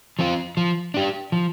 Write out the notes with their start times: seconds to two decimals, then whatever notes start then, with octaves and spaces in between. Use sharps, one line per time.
0.19 F3 C4 F4
0.57 F3
0.94 D4 G4
1.32 F3